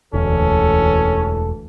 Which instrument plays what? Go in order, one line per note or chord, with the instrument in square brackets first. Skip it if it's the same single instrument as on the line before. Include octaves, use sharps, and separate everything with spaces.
[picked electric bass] E1 [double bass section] D2 E3 [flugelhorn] C#4 [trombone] A4